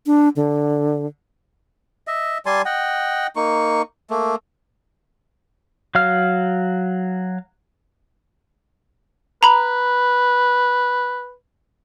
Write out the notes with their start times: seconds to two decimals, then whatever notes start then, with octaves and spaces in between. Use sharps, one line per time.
0.06 D4
0.36 D3
2.07 D#5 E5
2.46 G3 G#5 A5 C6
2.65 D#5 F#5 G5
3.36 A#3 D#4 C#6
4.10 A3 A#3
5.95 F#3 F5 F6
9.43 B4 A#5 B5